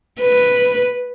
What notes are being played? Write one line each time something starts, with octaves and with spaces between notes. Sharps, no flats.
B4